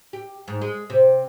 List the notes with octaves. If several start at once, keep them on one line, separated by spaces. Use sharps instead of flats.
G4
G#2
G#3
C3